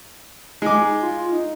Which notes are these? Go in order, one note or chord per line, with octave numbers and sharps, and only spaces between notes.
G#3 D#4 D6
F4
D#4